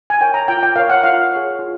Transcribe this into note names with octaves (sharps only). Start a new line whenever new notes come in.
G#5
A#4 C#5 G5
A#5
F4 G5
G5
A#4 C#5 F5
F#5
F4 F5
G#4 C#5
F4